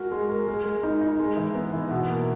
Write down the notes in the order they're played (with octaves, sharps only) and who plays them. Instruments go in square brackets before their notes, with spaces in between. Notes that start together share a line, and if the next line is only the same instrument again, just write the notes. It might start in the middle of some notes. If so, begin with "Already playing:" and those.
Already playing: [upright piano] G#3 F#4 A#4
G#3
A#4
G#3
G#3
D#4
D#4
G#3
E3
B3
E3
B2
A#3